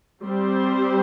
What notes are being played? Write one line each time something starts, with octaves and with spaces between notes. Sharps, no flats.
G3 C4 G4 C5